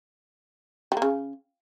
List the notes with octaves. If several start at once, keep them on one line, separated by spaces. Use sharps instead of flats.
G3
A#3
C#3